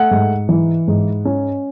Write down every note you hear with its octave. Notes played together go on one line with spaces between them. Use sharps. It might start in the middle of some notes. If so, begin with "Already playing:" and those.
Already playing: A3 F#5
G#2
E3
G#2
C#4